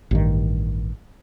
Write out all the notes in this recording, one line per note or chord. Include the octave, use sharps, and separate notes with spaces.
A1 G2 D#3